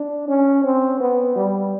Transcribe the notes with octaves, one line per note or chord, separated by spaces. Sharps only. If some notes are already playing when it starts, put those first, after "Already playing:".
Already playing: D4
C#4
C4
B3
G3